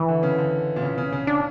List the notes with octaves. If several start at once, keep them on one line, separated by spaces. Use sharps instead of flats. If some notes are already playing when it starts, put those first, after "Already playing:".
Already playing: E3
D3
C#3
D3
A#2
C#3
C#3
C#3
D4